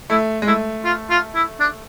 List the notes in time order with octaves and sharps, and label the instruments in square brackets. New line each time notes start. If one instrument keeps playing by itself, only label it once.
[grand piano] A3 [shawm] E4
[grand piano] G#3
[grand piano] A3 [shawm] E4
[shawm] F4
F4
E4
D4